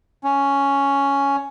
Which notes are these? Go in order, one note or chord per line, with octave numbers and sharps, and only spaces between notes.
C#4